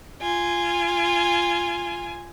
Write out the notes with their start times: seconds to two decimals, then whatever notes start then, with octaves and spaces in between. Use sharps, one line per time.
0.22 F4 G#5